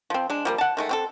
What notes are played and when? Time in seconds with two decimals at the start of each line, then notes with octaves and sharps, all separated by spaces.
0.10 F3 C4
0.30 G#3 D4
0.45 F3 G3 A#3
0.58 F#5 A5
0.77 D#3 G#3 A3
0.89 C4 G4 A4